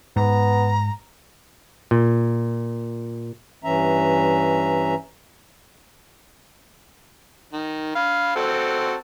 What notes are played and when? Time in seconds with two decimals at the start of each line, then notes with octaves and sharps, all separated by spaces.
0.16 G#2 B3 A#5
1.91 A#2
3.64 G2 E3 C#4 E5 A#5
7.53 D#3
7.95 F5 B5
8.36 C4 F#4 A4